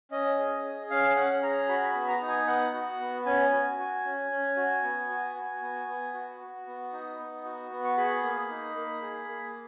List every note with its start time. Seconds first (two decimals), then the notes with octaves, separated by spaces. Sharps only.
0.12 C#4 D#5
0.38 G#4
0.64 G#4
0.91 C#4 F5
1.16 C#4 F#5
1.43 G#4 A#5
1.69 F#4 B5
1.89 B5
1.95 B3
2.08 A#5
2.21 D#4
2.28 G#5
2.47 B3 F#5
2.73 F#4
3.00 B3
3.26 C#4 G#5
3.52 F#4
3.78 F#4
4.04 C#4
4.31 C#4
4.57 F#4
4.83 B3
5.09 F#4
5.35 F#4
5.62 B3
5.87 B3
6.13 F#4
6.40 F#4
6.67 B3
6.93 D#4
7.19 B3
7.45 F#4
7.71 B3
7.84 C#6
7.97 G#4 B5
8.23 A#3
8.50 D#4
8.75 A#3
9.02 G#4
9.28 A#3